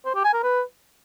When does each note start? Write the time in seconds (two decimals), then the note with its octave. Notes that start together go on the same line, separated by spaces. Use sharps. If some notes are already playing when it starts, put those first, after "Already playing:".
0.05 C5
0.15 G4
0.24 G#5
0.34 A#4
0.43 B4